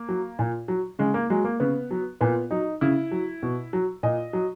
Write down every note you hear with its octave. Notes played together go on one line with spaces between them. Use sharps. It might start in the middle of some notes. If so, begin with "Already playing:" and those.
Already playing: A#3
F#3
A#2
F#3
C#3 G#3
A#3
F#3 G#3
A#3
C#3 B3
F#3
A#2 B3
F#3 D#4
C#3 E4
F#3
B2
F#3
A#2 D#5
F#3